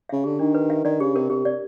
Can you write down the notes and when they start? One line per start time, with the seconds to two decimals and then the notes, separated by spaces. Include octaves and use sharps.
0.09 C#3 E5
0.24 D3 G4
0.39 D#3 D4
0.55 B4
0.70 E5
0.85 D#3 D5
1.00 C#3 G4
1.15 C3 A#4
1.30 C3 G4
1.45 C3 D5